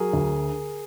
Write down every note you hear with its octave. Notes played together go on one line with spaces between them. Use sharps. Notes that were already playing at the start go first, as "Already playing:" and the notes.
Already playing: F#3 G#4 A#4
D2